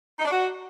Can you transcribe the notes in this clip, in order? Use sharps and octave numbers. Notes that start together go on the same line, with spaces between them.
D#4
D4
F#4